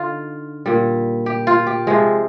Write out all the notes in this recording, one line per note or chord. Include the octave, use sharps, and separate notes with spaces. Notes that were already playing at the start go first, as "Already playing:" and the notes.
Already playing: D3 D#4 F4
A#2 G3
G4
F4
G4
C3 F3 G#3